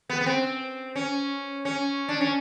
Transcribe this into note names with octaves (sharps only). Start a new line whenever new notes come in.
B3
B3
C4
C#4
C#4
D4
C#4